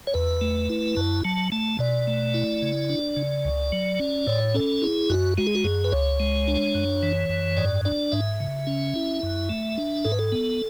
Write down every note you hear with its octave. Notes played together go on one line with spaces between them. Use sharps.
C#5
E2 B4
A3
E4
F#2 A5
F#3 A5
A3 A5
B2 D5
A3
E4
C#3
D4
C#3
C#2
F#3
C#4
A2 C#5
C#4 A4
E4 G#4
F#2 F#4
G#3 F#4
G#4
F#4
F#2 G#4
B4
C#2 C#5
G#3
D4
F#2
E3
F#2
G#2 D5
D4 D5
G#2 E5
C#3
C#4
E4
F#2
A3
D4
G#2 A4
B4
A4
B3